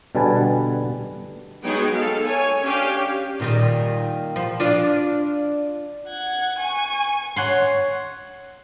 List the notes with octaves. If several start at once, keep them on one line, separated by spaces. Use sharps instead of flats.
B2 D3 G3 B4 G#5 A5
F#3 G#3 B3 D#4 G#4 G5
A4 F5
C#5 G#5
C#4 D4 G4 F5 G5
A#2 D#3 G3
F3
D4 F4 D5
F#5 G#6
G#5 C#6
C#5 F#5 C6